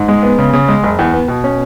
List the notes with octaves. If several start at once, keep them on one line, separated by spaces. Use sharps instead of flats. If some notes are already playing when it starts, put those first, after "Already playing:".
Already playing: G#2
G#3
B3
C#3
C#3
G#3
F#1
E2
B3
B2
C#4